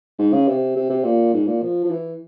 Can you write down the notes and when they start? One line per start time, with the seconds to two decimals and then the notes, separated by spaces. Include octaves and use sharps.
0.19 G#2
0.33 C#3
0.48 C3
0.76 C3
0.89 C3
1.04 A#2
1.33 G#2
1.47 A#2
1.62 F3
1.84 F3
1.90 E3